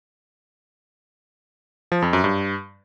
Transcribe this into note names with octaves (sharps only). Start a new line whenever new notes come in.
F3
F2
F#2
G2